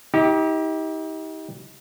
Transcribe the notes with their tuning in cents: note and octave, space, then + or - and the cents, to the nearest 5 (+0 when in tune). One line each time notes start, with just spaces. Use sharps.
D#4 +40 G4 +0